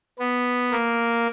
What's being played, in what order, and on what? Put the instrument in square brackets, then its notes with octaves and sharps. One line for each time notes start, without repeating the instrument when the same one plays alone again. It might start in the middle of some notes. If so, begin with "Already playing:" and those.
[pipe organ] B3
A#3